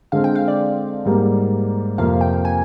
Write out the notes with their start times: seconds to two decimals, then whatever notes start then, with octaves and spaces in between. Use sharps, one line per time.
0.12 D3 G#3 C4 F5
0.24 G5
0.35 F5
0.48 D5
1.06 G#2 G3 A#3
1.98 F2 C3 F3 A#3 F5
2.21 G5
2.45 G#5